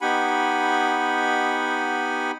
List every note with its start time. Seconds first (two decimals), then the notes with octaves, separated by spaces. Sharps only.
0.01 B3 D#4 G4 F#5 G#5 B5